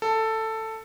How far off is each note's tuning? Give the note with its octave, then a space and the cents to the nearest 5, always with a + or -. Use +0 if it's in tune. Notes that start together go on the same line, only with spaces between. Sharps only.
A4 +10